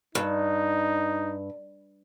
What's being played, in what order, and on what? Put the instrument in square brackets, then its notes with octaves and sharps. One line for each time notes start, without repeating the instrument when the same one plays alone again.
[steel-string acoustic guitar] G2 [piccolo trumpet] D#4